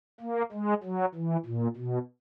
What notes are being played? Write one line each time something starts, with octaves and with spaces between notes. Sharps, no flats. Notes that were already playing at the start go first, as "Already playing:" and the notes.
A#3
G#3
F#3
E3
A#2
B2